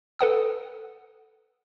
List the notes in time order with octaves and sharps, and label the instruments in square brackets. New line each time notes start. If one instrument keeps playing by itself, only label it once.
[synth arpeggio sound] A4 B4 F#5 D#6